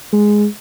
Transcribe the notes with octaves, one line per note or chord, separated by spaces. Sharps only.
G#3